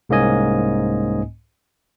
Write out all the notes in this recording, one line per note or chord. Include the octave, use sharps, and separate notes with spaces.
C2 G#2 A#3 C#4 D#5 G#5